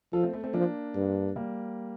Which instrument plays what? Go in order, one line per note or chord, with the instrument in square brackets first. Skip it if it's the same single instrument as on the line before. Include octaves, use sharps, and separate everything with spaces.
[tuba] F3 [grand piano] F4 A4
[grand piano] A3 C4
A3
A3 C4
[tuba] F3 [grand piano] A#3 D4
[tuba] G2
[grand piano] G3 A#3